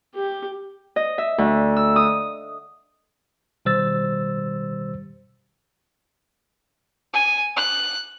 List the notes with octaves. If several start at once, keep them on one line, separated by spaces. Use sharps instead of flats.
G4
D#5
E5
D2
E6
D#6
B2 D#3 G3 C5 E6 A6
G#5
F#6